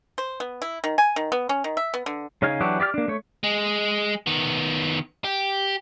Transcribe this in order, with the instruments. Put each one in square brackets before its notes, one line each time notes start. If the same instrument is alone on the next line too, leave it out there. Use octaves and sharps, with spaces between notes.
[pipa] C5
B3
E4
D#3
G#5
D#3
B3
C#4
D#3
E5
B3
D3
[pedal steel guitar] C#3 C#4 D#4 F5 G#5
E3 F#3 D4 F#4 G4
G4 D5 E5 F6
A#3 D4
A3 C#5
[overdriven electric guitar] G#3
D#3 B3
G4